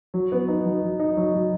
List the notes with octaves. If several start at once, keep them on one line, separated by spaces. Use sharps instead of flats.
F#3
B3
D#4
F#3
F#3
D#4
F#3
F#3